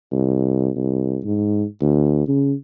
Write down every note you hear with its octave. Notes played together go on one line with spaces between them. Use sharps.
C2
C2
G#2
D2
C#3